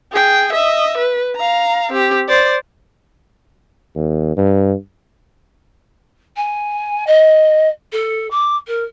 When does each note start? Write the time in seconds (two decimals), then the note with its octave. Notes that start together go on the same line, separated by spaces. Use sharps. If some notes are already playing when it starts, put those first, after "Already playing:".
0.12 G#4 G5
0.53 D#5 E5
0.97 B4
1.36 F5 A#5
1.92 C4 G4
2.28 C5 D5
3.95 D#2
4.37 G2
6.36 G#5
7.07 D#5
7.93 A4
8.31 D6
8.67 A#4